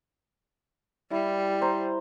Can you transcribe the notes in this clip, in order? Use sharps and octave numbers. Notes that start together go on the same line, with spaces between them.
G3 E4
C5 A#5